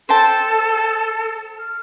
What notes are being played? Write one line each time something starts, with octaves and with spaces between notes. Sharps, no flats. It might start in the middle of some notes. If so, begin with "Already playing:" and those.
A4 C5 G5 A5
F6